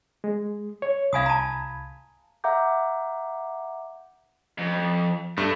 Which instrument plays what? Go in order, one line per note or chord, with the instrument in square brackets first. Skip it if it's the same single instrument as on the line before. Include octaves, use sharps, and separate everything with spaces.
[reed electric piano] G#3
C#5
[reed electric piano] C2 B5 G#6 [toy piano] F5 G#5 D#6
[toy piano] A5 A#5
[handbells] E5 F#5 A#5 D6 G6
[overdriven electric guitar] F2
[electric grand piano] G2 [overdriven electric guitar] A3